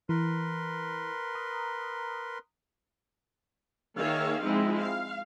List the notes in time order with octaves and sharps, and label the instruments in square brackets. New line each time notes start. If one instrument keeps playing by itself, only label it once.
[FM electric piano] E3 [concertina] A#4 B4 C6
[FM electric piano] A#5 D#6
[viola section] D#3 A#3 G#4 C#5 E5 F5
F3 G#3 C4 D#4 E4
F5